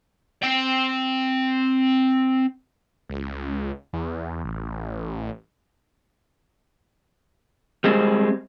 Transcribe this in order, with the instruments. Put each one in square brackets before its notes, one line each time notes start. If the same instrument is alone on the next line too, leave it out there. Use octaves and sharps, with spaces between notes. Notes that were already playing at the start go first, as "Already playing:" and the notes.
[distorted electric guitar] C4 G5
[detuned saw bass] C#2
E2
A1
[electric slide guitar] G3 G#3 C4